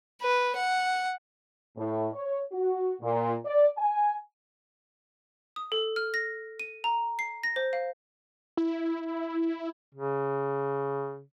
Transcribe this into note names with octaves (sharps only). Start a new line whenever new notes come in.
B4
F#5
A2
C#5
F#4
A#2
D5
G#5
D#6
A4
F6
A#6
D#7
A#5
C7
A#6
C5
F5
E4
C#3